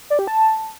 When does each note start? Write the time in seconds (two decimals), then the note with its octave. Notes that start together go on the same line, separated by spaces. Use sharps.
0.10 D5
0.19 G4
0.27 A5